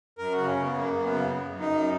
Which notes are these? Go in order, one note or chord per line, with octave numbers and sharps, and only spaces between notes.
F#2 A#4
F#4
C#3
C#4
C#3
B3
F#2 A#3
F#2
B3
C#3
F#2
F#2
D#4
F#2